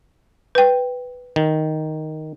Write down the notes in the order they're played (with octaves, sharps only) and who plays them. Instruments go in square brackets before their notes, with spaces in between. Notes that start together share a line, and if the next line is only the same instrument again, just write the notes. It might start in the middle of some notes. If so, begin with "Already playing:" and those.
[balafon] B4 G5
[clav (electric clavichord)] D#3